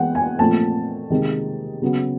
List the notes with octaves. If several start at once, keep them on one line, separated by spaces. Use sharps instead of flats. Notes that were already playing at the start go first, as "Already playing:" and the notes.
Already playing: E3 G#3 B3 F#5 G5
G#5
A#2 F3 A3 C4 A5
C3 D#3 G#3
C#3 F#3 B3